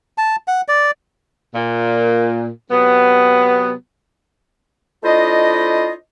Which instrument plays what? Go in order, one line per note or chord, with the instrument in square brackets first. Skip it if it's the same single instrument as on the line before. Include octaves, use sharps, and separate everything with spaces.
[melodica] A5
F#5
D5
[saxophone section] A#2
C3 F#3 B3
[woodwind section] A3 D4 E4 F4 C5 D#5